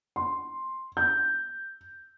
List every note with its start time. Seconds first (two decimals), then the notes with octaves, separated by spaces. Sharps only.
0.16 C6
0.97 G6